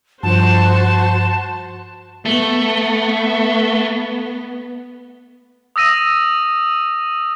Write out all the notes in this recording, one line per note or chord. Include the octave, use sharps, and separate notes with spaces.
G2 F3 F#4 C5 A5
A3 B3
D#6 E6 A#6 D#7